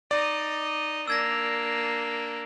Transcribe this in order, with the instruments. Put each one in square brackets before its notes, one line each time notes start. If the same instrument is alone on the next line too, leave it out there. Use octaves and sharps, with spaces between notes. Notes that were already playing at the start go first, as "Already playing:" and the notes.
[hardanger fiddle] D#4 D#5 [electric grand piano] D5
[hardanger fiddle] A#3 D4 [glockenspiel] E6 G#6 A#6